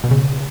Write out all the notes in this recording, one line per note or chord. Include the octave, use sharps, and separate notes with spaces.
B2
C#3